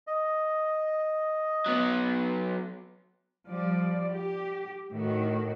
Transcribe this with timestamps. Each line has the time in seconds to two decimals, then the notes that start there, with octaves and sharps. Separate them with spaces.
0.07 D#5
1.66 F#3 B3
3.49 F3 G3 D5
4.12 G4
4.91 A2 D#3 F#4